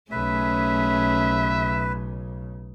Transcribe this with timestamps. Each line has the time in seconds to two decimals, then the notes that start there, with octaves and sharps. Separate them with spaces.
0.12 B1 C#3 A3 C#4 G#4 B4 E5